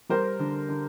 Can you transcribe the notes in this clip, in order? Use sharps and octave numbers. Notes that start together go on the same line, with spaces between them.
G3 A#4 C5
D3
D3